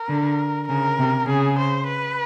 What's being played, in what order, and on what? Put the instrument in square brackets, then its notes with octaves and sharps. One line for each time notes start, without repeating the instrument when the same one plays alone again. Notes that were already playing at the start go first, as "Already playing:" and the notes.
Already playing: [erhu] A#4
[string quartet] D3
[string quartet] C#3 [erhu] A#4
[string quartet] C3
[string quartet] C#3 [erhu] G#4
[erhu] C5
B4